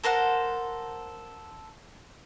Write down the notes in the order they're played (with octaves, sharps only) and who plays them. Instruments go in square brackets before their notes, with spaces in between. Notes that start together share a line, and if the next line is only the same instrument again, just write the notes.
[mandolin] A4 A#4 C5 F#5